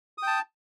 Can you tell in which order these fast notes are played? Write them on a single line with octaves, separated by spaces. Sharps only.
D#6 G5 A5